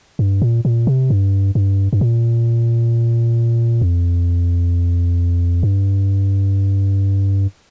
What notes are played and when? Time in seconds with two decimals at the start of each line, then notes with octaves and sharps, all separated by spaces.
0.19 G2
0.42 A#2
0.65 A#2
0.87 C3
1.10 G2
1.55 G2
1.93 G2
2.01 A#2
3.81 F2
5.63 G2